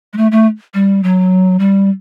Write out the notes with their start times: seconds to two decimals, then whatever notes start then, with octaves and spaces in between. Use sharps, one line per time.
0.13 G#3
0.17 A3
0.32 A3
0.74 G3
1.03 F#3
1.59 G3